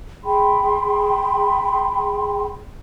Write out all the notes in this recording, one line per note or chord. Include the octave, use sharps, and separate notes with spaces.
G#4 G5 B5 C6